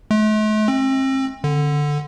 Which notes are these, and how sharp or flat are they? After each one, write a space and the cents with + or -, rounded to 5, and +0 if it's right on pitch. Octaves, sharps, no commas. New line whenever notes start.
A3 -45
C4 +35
D3 +5